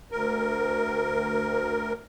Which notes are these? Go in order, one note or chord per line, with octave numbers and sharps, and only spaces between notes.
D2 A#4